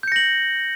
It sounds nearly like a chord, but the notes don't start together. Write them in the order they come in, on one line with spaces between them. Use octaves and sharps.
G6 C#7 A#6 F#7